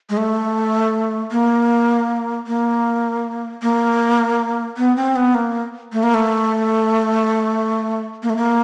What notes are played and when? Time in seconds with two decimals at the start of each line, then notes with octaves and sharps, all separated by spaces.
0.10 G#3
0.17 A3
1.32 A#3
2.47 A#3
3.62 A#3
4.77 B3
4.96 C4
5.16 B3
5.35 A#3
5.93 A3
6.03 A#3
6.14 A3
8.23 A#3
8.30 A3
8.37 A#3